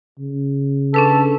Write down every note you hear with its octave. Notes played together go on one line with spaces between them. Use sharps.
C#3
C#4 D4 A4 B4